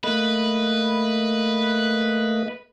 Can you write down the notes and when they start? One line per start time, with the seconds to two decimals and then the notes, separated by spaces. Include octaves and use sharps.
0.04 A3 A#3 B4 D#5